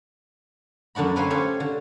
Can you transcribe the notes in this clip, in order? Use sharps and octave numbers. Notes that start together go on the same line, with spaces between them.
F#2 D3 D4 F#4 B5
A3 C4 B4 C#5 E5 F5
C#4 G4 A4 C5 C#5
D3